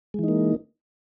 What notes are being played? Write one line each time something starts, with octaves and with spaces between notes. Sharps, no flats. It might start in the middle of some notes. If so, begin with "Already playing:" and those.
E3 G#3 A#3 D#4